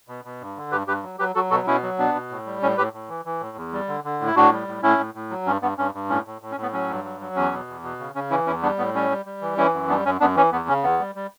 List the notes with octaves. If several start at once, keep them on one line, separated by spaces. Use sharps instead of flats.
B2
B2
G2
D3
G2 G4 B4
G2 G4 B4
F#3
F#3 G4 B4
F#3 F#4 A4
B2 F#4 A4
B2 C#4 E4
F#3
B2 B3 D4
B2
A2
G3
A2 C#4
A2 G4 B4
A2
E3
E3
A2
E2
G3
D3
D3
A2
E4
A2 D4 F#4
G3
A2
A2 C#4 E4
A2
A2
F#3
G2 C#4
G2 B3
G2 C#4
G2
A2 C#4
A2
A2
C#4
A2
B3
F#3 C#4
G2
F#3
F#3
E2 C#4
B2
E2
B2
C#3
C#3 C#4
E3 C#4 E4
E2 C#4 E4
G3 B3 D4
A2 B3
G3 C#4
G3
G3
E3
E3 C#4 E4
F#2
G3 B3 D4
F#2 C#4
F#2 B3 D4
E3 C#4
E2 B3
C#3 C#4
E2 B3
G3
G3